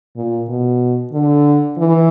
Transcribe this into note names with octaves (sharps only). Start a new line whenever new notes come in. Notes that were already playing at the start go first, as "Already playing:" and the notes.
A#2
B2
D3
E3